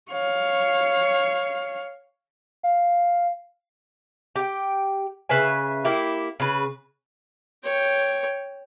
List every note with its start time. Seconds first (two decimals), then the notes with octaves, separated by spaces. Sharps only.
0.11 C#5 F5
2.63 F5
4.36 G4 G5
5.29 C#3 B4 E5 G#5
5.84 A#3 E4 G4
6.40 C#3 B4
7.65 C#5 G5